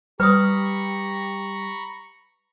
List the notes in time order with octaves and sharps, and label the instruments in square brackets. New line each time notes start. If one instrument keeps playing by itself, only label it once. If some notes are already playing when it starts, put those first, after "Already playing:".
[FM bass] G3 [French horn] G4 [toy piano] B4 D#6 [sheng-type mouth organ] A#5 B5 C#6